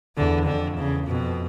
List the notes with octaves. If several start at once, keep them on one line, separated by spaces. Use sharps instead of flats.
E2 D3
F2 D3
E2 C#3
F2 B2